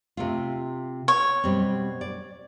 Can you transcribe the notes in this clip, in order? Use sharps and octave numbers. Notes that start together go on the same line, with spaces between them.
C3 A3 F4
C#5
B2 G3 C4
D5